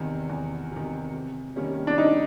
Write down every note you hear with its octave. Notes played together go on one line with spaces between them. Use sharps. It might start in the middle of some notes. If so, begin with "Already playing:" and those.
Already playing: E2 C3 D#3
E2
C3 D#3
C3
D#3 G3 A#3 C#4
D4
C3 D#4